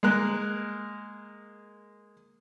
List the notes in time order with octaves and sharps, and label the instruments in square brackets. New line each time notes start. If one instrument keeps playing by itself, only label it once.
[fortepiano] G#3 A#3 A#4 F#6